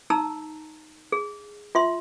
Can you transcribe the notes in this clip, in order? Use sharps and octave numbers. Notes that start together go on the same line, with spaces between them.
D#4 A5 A#5 E6
G#4
F4 E5 C6